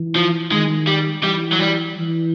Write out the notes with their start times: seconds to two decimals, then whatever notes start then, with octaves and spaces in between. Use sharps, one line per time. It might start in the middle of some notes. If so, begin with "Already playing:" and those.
Already playing: E3
0.16 F3
0.52 D#3 G#3
0.87 G3
1.24 E3 G3
1.53 F#3
1.60 G3
1.96 E3